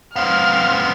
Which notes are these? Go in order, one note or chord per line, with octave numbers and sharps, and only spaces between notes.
B3 C4 F5 F6